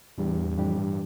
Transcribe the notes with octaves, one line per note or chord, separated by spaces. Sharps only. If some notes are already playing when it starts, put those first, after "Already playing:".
E2 A2 E3 G3 D4 G4
F2 A2 E3 G3 D4 G4
G2